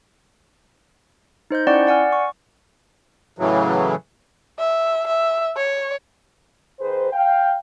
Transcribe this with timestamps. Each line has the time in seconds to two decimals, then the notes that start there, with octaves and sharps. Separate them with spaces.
1.51 D#4 C5 D#5 G6
1.67 C#4 E4 D5 F#5 G5 C#6
1.87 D5 F#5 G#5 F6
2.12 C#6
3.39 A2 C#3 E3 F#3
4.59 E5
5.07 E5
5.57 C#5
6.79 D#3 G#4 B4 C5
7.12 F5 G5